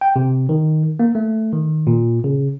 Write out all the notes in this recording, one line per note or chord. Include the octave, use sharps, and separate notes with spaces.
G5
C3
D#3
A#3
A3
D#3
A#2
C#3